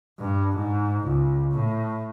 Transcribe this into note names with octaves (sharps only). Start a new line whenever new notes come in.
G2
G#2
C#2
A2